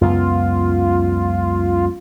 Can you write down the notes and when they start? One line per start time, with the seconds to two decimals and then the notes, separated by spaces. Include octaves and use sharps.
0.01 C#2 F#2 B3 F4